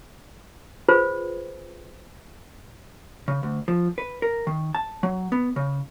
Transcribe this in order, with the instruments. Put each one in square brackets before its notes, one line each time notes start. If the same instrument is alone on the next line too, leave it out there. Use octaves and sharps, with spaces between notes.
[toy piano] F4 G#4 B4 C5
[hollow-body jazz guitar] C#3
D2
F3
B4
A#4
D#3
A5
F#3
B3
C#3